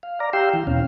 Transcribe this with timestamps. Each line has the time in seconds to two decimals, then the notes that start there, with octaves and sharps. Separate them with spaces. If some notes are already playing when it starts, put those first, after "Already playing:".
0.03 F5
0.20 D5 A#5
0.33 G4 F5 G5 C6 E6
0.54 E3
0.67 E2 B2 C#4 F5